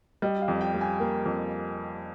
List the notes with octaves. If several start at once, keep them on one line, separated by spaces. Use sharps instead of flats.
G3 D#5
F5
F2
G5
G3
G#5
A#3
F2